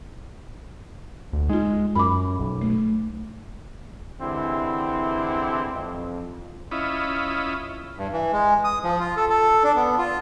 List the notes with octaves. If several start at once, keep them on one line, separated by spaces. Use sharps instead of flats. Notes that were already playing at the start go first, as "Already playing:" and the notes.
D2
G#3 D#4 F4
F#2 B5 D6
B1
A3
D3 E3 G#3 C4 E4 G4
F2
C#4 E4 F4 D#5 B5
G2
E3
G#3
D#6
F3
F4
A4
A4
D4
B3
F4